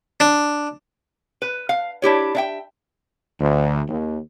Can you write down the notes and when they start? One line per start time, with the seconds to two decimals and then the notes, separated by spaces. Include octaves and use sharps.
0.20 D4
1.42 B4
1.69 F5
2.02 D4 E4 G4 C#5
2.35 D4 E5 G5
3.39 D2
3.87 D#2